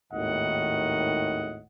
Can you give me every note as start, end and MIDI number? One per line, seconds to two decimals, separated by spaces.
0.12 1.61 32
0.12 1.61 39
0.12 1.61 45
0.12 1.61 51
0.12 1.61 75
0.12 1.61 78